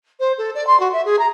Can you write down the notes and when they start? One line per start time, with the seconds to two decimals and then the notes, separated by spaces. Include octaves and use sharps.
0.20 C5
0.38 A4
0.55 D5
0.67 C6
0.80 F#4
0.93 E5
1.05 G#4
1.19 A#5